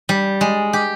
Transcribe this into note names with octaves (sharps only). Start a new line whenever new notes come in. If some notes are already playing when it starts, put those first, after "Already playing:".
G3
G#3
G4